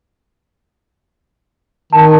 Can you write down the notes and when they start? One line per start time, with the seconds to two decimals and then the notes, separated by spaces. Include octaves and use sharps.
1.93 D#3 A5